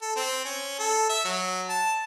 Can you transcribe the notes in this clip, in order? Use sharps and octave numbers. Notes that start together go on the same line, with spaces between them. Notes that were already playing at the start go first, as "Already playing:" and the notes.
A4
C4
C#4
A4
E5
F#3
A5